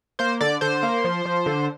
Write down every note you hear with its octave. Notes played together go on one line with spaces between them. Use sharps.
A#3 C5
D3 D5
D3 C5
A#3
F3
F3
D3